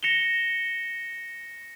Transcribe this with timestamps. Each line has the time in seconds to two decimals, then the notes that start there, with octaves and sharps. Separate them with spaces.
0.03 A#6 C#7 E7 F7 G7